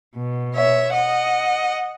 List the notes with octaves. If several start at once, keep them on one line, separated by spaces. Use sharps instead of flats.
B2
C#5 E5
D#5 F#5